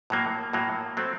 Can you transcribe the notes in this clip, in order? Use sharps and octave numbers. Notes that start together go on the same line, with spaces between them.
A2 F#3 A#3
A2 F#3 A#3
F#3 A3 C4